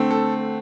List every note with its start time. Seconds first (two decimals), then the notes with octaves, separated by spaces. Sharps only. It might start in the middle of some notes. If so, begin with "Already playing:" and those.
Already playing: D3 A3 C4
0.10 A4